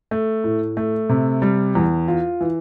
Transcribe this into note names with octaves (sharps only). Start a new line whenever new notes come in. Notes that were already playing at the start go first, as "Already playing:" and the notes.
A3
A2
A3
C3
G3
E2
F4
E3